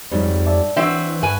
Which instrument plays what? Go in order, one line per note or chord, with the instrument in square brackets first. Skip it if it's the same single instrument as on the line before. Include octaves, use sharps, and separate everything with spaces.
[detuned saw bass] F2 [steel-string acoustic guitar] G#2 F#3 G3 [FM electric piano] C4
[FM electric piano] D5 E5 A5
[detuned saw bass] E3 [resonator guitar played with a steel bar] F#3 C4 E5 [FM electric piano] D4 [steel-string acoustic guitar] F#4
[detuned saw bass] G2 [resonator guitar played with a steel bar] B4 G#5